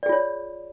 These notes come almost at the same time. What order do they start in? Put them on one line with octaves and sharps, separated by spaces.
D5 G#4 F4 C#5